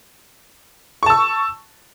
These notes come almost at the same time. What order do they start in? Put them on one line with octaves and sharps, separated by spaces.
C#6 A5 E6